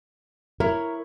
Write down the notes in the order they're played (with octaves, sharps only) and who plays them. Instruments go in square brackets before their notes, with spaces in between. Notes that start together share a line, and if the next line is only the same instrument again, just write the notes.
[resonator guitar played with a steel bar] E4 C#5 [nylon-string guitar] A#4